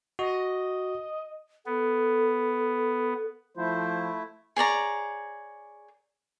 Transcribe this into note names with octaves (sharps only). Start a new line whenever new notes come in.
F#4 D#5
B3 A4
F3 A3 E4 C5
G#4 C#5 D5 A#5